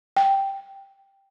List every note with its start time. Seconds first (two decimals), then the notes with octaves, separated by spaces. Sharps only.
0.17 G5